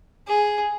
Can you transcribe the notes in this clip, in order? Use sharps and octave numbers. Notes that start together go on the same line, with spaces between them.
G#4